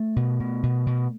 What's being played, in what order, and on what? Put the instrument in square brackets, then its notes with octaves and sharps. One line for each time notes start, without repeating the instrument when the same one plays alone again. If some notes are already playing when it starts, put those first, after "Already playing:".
Already playing: [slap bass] A3
B2
B2
B2
B2